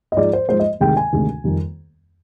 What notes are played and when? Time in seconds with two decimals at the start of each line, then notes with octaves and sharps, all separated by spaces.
0.12 D#5
0.17 G#2 F3 G#3 D5
0.33 C5
0.49 G#2 F3 G#3 C5
0.59 D#5
0.80 D2 C3 D#3 G#3 G5
0.97 G#5
1.13 D2 C3 D#3 G#3
1.44 F2 D#3 G3